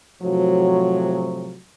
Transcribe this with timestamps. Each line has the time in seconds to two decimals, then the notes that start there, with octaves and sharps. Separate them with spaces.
0.22 A2 C3 F3 F#3